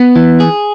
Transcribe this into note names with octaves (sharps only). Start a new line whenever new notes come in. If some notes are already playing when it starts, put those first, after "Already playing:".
Already playing: B3
E3
G#4